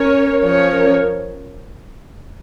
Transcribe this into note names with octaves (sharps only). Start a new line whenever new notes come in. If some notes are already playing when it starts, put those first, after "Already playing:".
Already playing: C#4 A#4 C#5
F3 C#4 A#4 C#5